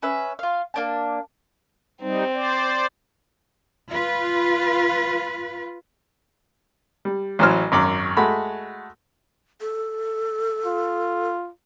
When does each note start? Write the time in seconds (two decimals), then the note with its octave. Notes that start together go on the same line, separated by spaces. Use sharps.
0.02 C#4 B4 E5
0.39 F4 F5
0.74 A#3 D4 A5
2.01 G3 C4 D#4
2.34 C5 D5
3.90 F4 B4
7.05 G3
7.39 A1 E3 F#3 C5 F6
7.72 G#1 F#2 D6
8.17 G#3 A3 F#4 B5
9.61 A4
10.66 F4